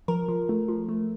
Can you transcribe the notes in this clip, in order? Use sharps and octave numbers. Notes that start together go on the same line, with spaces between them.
F3 A#4
F3
A3
F3
A3